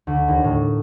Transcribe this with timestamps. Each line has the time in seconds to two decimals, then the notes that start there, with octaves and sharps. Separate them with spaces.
0.07 D2
0.28 D#2
0.44 A2